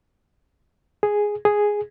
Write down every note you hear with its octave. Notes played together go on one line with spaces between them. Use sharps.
G#4
G#4